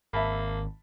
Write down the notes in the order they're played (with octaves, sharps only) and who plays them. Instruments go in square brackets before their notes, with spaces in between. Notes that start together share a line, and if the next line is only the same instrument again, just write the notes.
[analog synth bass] G#1 [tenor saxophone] A#3 [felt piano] E5 A5 B5